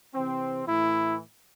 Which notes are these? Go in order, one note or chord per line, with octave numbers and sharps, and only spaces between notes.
C3 E3 C4
A2 E3 E4